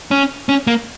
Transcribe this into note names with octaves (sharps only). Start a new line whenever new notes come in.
C#4
C#4
A#3